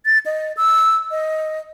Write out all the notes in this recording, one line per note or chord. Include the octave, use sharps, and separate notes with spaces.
A6
D#5
E6
D#5